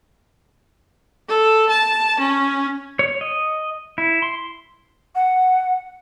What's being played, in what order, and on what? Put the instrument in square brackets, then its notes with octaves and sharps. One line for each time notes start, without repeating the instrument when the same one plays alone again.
[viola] A4
A5
C#4
[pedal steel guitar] C#5
D#5
E4
C6
[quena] F#5